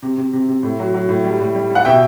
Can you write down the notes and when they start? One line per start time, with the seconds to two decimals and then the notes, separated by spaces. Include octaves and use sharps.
0.02 C3
0.18 C3
0.33 C3
0.49 C3
0.63 A2
0.79 F#3
0.94 F#3
1.09 A2
1.24 G3
1.40 A2
1.55 G3
1.70 G3
1.75 F#5
1.85 B2 E5 G5